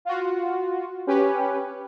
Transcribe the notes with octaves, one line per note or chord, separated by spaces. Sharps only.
F4 F#4
C#4 G4 B4